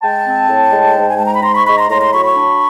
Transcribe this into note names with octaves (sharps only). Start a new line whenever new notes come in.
G#3 G5 A5
C4
A2
G#3
G#2
G#5
G#3 A5
A#5
B5
G#2 A#5 C6
B5 C#6
G#3 B5 C#6
A#5 C6
A2 A#5 C6
A#5 C6
F#3 B5 C#6
B5 C#6
D4